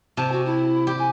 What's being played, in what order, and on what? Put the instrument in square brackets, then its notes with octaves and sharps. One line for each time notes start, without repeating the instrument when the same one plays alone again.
[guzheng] C3 [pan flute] A5
[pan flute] F#4
E4
[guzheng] G4
[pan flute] G#5